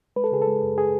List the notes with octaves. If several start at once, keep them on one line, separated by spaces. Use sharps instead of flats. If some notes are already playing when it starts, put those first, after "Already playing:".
G#3 B4
A4
C#3 G#4
A4
G#3
F#2
G#4